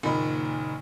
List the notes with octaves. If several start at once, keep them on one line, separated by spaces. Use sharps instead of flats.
F#1 A#2 D#3 D#4 B5